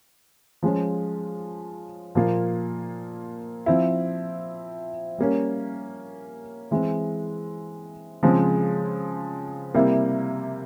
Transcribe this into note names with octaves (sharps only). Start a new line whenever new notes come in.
F3 G#3 C#4 F4
A#2 F3 A#3 F4
F3 C4 E4
G3 A#3 C#4
E3 G#3 C4
C#3 F3 G#3 C4
C3 G3 A#3 E4